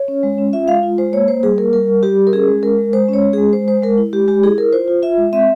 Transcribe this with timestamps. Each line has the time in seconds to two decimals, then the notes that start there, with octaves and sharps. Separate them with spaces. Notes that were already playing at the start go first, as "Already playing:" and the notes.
Already playing: C#5
0.08 C#4
0.23 G#3
0.38 C#4
0.53 F4 E5
0.68 G#3 F5
0.83 F4
0.98 G#3 C5
1.13 A#3 C#5
1.28 A#3 C5
1.43 G3 G#4
1.58 A#3 A#4
1.73 G3 A#4
1.88 G3
2.03 G3 G4
2.18 G3
2.27 A#4
2.33 C#4 G#4
2.48 G#3
2.63 G#3 A#4
2.78 G#3
2.93 G#3 C5
3.08 C#4
3.13 C#5
3.23 G#3
3.33 G#3 G#4
3.53 G#3 C5
3.68 G#3 C5
3.82 G#3 A#4
3.98 E4
4.13 G#3 G4
4.28 G#3 G4
4.43 E4 G#4
4.58 E4 A#4
4.73 F4 C5
4.88 F4
5.02 F4 E5
5.18 G#3
5.33 C4 E5